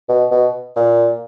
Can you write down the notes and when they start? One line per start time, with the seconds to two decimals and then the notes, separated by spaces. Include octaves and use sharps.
0.09 B2
0.31 B2
0.76 A#2